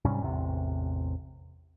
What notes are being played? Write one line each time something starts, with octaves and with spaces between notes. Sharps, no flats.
G#2 C3 G3 C#4
A1 E2 C3